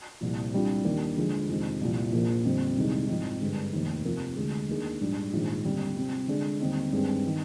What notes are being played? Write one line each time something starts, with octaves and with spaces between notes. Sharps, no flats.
C2 A#2 F3
C2 C3 G3 D4 F4
D#2 D#3 A#3 D4 G4
D3 F3 G#3 D4
F2 C3 D#3 G#3
C2 A#2 F3
A#1 A#2 F3 A#3
F2 D3 G3 C4
C2 C3 D#3 G#3 D#4
G#2 F3 C4 D#4
G2 D3 G#3
F1 D#2 D#3
C3 F3 C4 F4 A#4
D2 D3 G#3
D#2 D#3 A#3 D4 G#4
A#1 G#2 G3 D4
A#1 G#2 D#3
D#2 D3 G3 C4
C3 G3 C4
D3 G#3 D4
D#2 D3 G3 C4 D#4
G2 D#3 G#3 C4
D#3